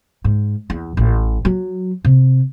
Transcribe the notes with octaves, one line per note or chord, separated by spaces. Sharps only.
G#2
E2
A1
F#3
C3